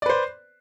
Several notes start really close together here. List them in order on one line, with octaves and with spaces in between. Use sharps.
D5 B4 C5